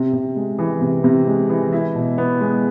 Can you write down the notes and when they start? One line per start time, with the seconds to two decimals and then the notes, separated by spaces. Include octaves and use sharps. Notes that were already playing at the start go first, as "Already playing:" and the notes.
Already playing: C3
0.13 C3
0.36 G#3
0.59 E3
0.81 C3
1.04 C3
1.27 G#3
1.49 E3
1.73 E4
1.95 B2
2.18 B3
2.41 G#3